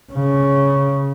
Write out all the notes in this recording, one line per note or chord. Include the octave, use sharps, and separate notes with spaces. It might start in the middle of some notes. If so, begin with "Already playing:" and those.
C#3